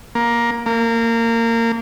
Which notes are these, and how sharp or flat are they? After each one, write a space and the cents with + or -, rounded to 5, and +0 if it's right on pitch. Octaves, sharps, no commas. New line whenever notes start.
A#3 +15
A#3 -20